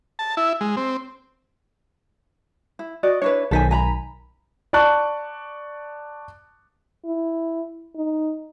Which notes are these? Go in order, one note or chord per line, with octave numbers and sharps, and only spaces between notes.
A5
E4
G#3
C4
E4
F#4 D5 D#5 D#6
D4 E4 B4 C#5
B1 D#3 A4 C5 G#5 B6
G#5 A#5 B5
D5 A5 C#6 F#6
E4
D#4